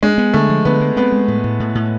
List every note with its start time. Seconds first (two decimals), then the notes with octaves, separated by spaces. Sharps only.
0.03 G#3 D4
0.18 B3
0.33 D3 A3
0.49 F3
0.65 D3 B3
0.81 G#3
0.96 B3 C4
1.12 G#3
1.28 A2
1.44 A2
1.60 A2
1.75 A2